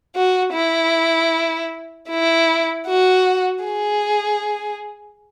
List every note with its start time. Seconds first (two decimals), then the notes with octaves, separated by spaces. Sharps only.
0.16 F#4
0.53 E4
2.09 E4
2.87 F#4
3.64 G#4